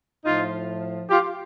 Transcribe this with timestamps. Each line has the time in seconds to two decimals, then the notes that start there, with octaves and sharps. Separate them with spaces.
0.25 A2 F3 D#4 F4
1.09 F4 G4